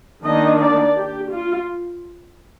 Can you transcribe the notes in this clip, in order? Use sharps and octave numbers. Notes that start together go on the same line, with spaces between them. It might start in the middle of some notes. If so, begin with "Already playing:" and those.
D#3 A#3 D4 D#5
D5
G4
F4